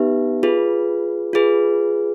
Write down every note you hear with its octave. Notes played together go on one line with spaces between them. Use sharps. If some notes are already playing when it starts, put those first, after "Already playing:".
Already playing: B3 D#4 G4 B4 E5
F4 G#4 B4
F4 G#4 B4